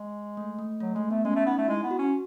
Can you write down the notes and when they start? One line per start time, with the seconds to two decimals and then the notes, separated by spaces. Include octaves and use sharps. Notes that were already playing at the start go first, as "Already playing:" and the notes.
Already playing: G#3
0.37 A3
0.59 A3
0.80 F#3 A3
0.95 G#3 A3
1.10 A3 B3
1.25 G#3 C#4
1.35 A3
1.46 B3 D#4
1.58 A3
1.68 G#3 E4
1.83 B3
1.91 F#4
1.98 C#4